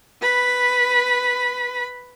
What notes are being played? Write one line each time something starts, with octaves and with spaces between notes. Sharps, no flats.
B4 B5